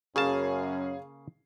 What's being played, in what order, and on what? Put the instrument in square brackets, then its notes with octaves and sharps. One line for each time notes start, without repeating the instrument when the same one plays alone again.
[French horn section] F#2 C#4 [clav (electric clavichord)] C#3 A#3 A5 [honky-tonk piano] G#4 F5